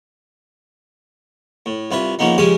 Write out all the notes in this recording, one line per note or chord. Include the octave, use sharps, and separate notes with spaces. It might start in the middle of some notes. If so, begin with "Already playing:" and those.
A2
C2 F4 B4 E5
C#3 F3 A#3 B3 D#4
C#3 F3 G3 G#3 G#4 D#6